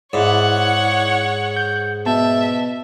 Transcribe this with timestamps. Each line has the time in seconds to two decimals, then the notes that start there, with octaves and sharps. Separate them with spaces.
0.13 G#2 E4 C#5 D5 F#5
1.56 G6
2.06 B2 E5 A5